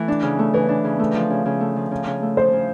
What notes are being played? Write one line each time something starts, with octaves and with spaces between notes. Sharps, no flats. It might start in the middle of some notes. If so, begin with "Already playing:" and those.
Already playing: E3 A3
D4
C#3
A3
E3 B4
D4
C#3
A3
F3
C#3
C#3
A3
F3
C#3
C#3
A3
F3 C5
C#3